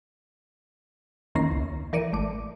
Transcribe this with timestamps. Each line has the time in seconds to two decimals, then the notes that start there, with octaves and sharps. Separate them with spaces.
1.35 E2 D#3 A#3 C#4 A#6 C7
1.51 C#2
1.93 E3 A#4 D5 C#7 D#7
2.13 G#1 A3 D6